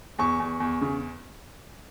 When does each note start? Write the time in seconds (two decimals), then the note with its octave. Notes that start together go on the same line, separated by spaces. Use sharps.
0.19 E2 C#6
0.40 E2
0.60 E2
0.81 C#3